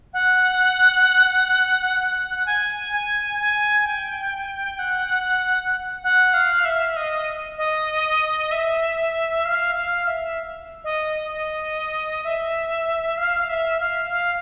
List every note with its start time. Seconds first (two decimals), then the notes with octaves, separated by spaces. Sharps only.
0.13 F#5
1.99 F#5
2.46 G#5
2.92 G#5
3.39 G#5
3.85 G5
4.79 F#5
6.03 F#5
6.33 F5
6.65 E5
6.96 D#5
7.58 D#5
8.51 E5
9.45 F5
9.75 F5
10.07 E5
10.84 D#5
11.31 D#5
12.24 E5
13.17 F5
13.49 E5
13.80 F5
14.10 F5